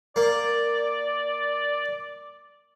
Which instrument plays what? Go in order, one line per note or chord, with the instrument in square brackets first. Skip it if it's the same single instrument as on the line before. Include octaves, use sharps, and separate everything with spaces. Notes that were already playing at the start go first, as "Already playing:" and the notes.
[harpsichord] A#3 [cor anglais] D5